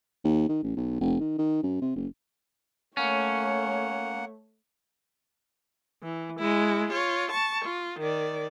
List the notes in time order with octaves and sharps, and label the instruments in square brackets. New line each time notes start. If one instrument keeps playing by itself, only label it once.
[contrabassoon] D#2
D#3
A1
B1
F1
D#3
D#3
F#2
C3
F#1
[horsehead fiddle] A3 C#5 [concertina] A#3 F#5 [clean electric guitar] C#4
[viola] E3
G#3 E4
F4 C#5
A5 C#6
F4
D#3 D5